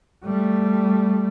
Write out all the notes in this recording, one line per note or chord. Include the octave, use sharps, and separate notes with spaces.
G3 A3